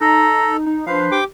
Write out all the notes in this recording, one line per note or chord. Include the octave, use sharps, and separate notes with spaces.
D#4 A4 A#5
D#4
F3 D4 B4 C5 F5
G4 G5 D6